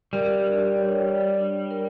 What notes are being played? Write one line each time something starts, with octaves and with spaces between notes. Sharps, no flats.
G3 A#4
D4
C#5
D5
D4
A#4